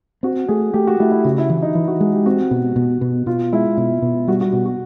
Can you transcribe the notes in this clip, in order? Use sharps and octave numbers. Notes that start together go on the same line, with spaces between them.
C4 F#4
A3 G#4
A3 G4
F#4
A3 E4
E4
C#3 F#4
E4
E3 E4
D#4
E3 E4
F#4
G#3 G#4
G4
C4 F#4
B2
B2
B2
B2 F4
G#3 E4
B2 E4
B2
G3 F#4
F#4
B2 F#4
F#4